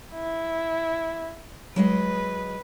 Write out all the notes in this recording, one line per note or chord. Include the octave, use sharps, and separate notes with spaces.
E4
F#3 G#3 B4 D#5